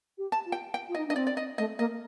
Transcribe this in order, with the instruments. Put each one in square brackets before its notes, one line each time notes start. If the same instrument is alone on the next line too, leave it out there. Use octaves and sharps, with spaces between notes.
[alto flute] G4
[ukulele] A5
[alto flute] F4
[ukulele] G5
G5
[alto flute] F4
[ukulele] D#5
[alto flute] D#4
[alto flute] D4 [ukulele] D#5
[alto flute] C4 [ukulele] D5
[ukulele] D5
D#5
[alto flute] A3 [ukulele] D#5
[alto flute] A#3 [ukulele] D#5